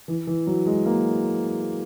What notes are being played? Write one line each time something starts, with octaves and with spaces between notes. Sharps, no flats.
E3
E3
F#3
G#3
A#3